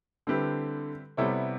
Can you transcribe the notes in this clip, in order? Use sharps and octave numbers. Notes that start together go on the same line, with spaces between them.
D3 G3 C4 E4 G4 B4
C3 G3 B3 E4 A4 C#5